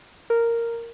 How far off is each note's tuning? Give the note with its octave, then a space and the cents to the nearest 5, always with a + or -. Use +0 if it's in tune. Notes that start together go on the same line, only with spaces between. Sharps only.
A#4 -5